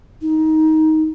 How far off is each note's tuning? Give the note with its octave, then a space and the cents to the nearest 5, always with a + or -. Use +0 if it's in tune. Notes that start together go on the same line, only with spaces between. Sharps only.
D#4 +15